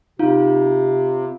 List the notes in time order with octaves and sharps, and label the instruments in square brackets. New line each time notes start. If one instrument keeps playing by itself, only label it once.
[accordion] C3 [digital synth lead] D#4 [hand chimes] F4 F5